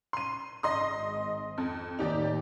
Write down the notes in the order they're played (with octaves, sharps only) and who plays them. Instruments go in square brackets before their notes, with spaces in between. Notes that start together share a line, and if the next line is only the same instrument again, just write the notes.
[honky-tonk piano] C6 D#7
[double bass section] G#1 G#2 [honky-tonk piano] D#5 C6 D#6
[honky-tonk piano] F2
[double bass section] D#2 A2 [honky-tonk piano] D#4 G4 D5